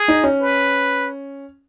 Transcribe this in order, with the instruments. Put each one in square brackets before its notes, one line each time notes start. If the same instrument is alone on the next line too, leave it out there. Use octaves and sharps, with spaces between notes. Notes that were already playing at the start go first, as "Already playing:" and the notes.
Already playing: [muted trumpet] G#4
[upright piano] D#4
C#4
[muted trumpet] B4